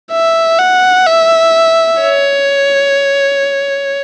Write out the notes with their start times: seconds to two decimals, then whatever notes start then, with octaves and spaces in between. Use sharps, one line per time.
0.12 E5
0.59 F#5
1.06 E5
2.00 C#5